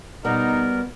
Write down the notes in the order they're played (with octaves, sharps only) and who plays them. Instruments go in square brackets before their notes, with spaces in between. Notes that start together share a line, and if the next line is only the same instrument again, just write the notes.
[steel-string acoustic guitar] B2 G3 B3 [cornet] D#4 [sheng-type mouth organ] A#4